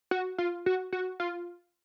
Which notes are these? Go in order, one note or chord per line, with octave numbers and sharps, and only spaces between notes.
F#4
F4
F#4
F#4
F4